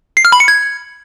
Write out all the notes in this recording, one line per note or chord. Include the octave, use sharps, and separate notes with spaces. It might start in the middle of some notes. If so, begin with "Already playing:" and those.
C7
F6
B5
C#7
G#6